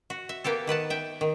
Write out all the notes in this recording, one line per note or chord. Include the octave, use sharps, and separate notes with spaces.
F#4
E5
A#3 B3 G4 A4
D#3 B4 F#5 A5
E5 G5
D#3